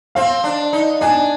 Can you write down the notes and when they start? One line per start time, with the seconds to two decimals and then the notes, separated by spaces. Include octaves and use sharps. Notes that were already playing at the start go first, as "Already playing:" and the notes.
0.15 C4 F5
0.44 D4
0.73 D#4
1.01 D4 G#5